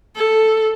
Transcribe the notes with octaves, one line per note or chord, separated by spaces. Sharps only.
A4